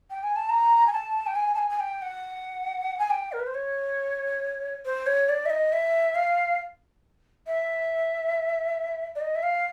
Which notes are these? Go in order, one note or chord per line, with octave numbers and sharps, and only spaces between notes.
G5
G#5
A5
A#5
G#5
A5
G5
G#5
A5
G#5
G#5
G5
F#5
G#5
G5
A#4
B4
C5
C#5
C5
C#5
D5
E5
D#5
E5
F5
E5
D5
D#5
E5
F5